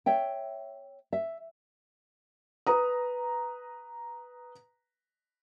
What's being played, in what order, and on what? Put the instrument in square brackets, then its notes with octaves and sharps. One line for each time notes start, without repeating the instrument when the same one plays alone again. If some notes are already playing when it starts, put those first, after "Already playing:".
[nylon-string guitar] C#5 E5 G5
E5
[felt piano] B4 A#5 D#6